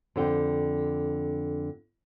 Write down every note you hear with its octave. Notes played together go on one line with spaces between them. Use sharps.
F2 D3 G5